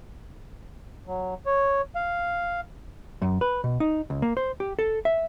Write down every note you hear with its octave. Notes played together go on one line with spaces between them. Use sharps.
F#3
C#5
F5
F#2
B4
B2
D#4
C#2
A#3
C5
G4
A4
E5